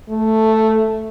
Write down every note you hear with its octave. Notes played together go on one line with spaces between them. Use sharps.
A3